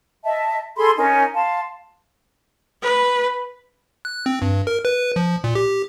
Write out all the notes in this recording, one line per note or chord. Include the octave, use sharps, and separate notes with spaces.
D#5 E5 A5
G#4 A4 B5 C6
C#4 D#4 A#4 G#5
F5 A5 C6
B4
F#6
C4
G2
A#4
B4
F3
A#2
G4